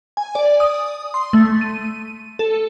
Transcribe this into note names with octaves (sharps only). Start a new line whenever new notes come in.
G#5
D5
D#6
C6
A3
D#7
A4